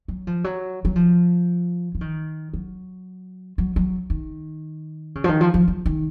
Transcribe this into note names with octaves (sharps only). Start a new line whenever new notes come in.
F#3
F3
F#3
F#3
F3
F3
D#3
F#3
F#3
F#3
D#3
C#3
F3
D#3
F3
F3
F#3
D#3